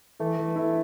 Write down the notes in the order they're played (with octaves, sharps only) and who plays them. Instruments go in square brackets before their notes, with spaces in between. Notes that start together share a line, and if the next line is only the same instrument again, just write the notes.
[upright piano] E3 [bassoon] A3
[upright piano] E3
E4